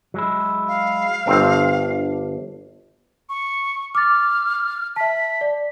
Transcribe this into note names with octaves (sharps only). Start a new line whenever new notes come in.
F#3 G#3 E4
F5
G1 C4 D4
C#6
D6 F6 A6
E5 A5 B6
D5